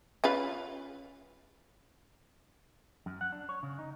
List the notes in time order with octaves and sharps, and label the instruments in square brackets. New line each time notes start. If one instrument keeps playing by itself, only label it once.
[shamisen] C#4 F4 B4
[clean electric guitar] F#2
F#5
D4
C#5
C#3
D#4